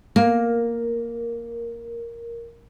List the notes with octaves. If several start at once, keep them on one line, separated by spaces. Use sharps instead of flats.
A#3 A#4